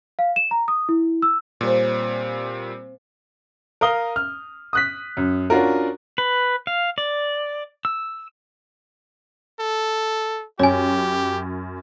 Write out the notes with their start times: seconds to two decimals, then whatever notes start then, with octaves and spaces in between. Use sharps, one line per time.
0.19 F5
0.36 E7
0.51 A#5
0.68 D#6
0.89 E4
1.22 E6
1.61 A#2 G3 C4 C5 C#5
3.81 A#4 F5 D#6 G7
4.16 F6
4.73 D#6 F#6 B6
5.17 F#2
5.50 C#4 D4 F4 F#4 A#4
6.18 B4
6.67 F5
6.98 D5
7.85 E6
9.60 A4
10.59 F#2 G4 C#5 G#5